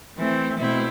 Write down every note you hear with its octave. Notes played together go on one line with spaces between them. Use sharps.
E3 A3 C4
B2 A3 C4 E4